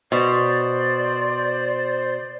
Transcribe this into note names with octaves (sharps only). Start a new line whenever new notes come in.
B2 C5 D5